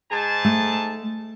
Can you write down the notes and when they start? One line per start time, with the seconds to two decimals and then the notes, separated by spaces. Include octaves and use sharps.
0.11 G#2 G#4 A5
0.45 A3